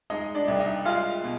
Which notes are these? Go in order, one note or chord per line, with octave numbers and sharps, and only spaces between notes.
G#3 D#4 D#5
D4 D5
C2
D#4 D#5
G#3 F4 F5
B2